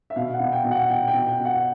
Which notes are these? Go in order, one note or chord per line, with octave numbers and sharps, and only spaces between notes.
E5
B2 F5
F#5
B2
G5
B2
F#5
B2 G5
G5
B2
G5
B2
F#5